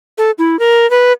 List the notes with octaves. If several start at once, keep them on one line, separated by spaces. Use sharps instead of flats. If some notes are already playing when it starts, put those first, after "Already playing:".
A4
E4
A#4
B4